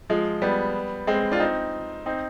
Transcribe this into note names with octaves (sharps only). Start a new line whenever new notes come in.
F3 G#3
G3 B3
G#3 C4
D4 F4
C4 D#4
C4 D#4